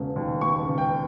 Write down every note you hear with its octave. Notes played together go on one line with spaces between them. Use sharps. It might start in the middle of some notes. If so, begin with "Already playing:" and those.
Already playing: E1 C#3
D#2
E1 C#6
C#3
G5